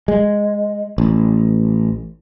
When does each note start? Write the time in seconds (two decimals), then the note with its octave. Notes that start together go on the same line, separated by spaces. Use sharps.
0.08 G#3
0.98 A1